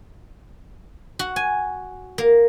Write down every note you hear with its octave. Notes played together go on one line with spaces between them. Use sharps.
F#4
G#5
A#3